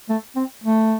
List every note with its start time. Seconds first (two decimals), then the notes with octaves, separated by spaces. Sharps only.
0.09 A3
0.36 C4
0.64 A3